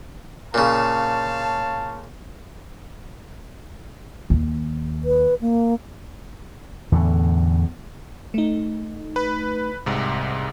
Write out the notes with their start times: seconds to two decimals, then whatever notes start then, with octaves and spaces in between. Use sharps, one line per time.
0.54 A#2 C#3 C#5 F5 A5
4.30 D#2
5.04 B4
5.41 A#3
6.92 E2 A2 D3
8.34 A3 D#4
9.16 B4 B5
9.86 C2 G#2 C3